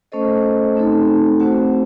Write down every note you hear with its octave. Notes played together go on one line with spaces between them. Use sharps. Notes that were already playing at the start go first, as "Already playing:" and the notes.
A3 C#4 A4 C5 D#5
A3 C4 D#4 A4
A3 C4 F#4 C5 F#5